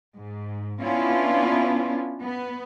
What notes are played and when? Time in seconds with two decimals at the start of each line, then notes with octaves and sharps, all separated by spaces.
0.13 G#2
0.82 B3 C#4 D4 E4 F4
2.22 B3